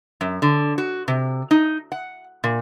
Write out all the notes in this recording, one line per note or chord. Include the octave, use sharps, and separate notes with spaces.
F#2
D3
F#4
C3
D#4
F#5
A#2